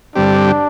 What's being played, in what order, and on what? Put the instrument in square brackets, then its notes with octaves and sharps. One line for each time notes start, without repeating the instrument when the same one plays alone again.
[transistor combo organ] G2 D3 G3 C4 G4 [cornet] D4